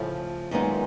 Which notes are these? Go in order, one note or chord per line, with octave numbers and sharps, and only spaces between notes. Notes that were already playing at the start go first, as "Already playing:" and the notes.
Already playing: A2 C#3 F3 A3
F#2 A#2 D#3 G#3 B3 D#4